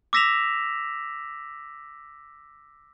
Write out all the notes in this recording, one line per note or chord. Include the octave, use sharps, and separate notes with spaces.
D6 E6 A#6 B6 E7 F7